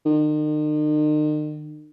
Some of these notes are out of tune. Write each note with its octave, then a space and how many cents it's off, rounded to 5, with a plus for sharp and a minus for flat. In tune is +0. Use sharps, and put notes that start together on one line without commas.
D#3 -40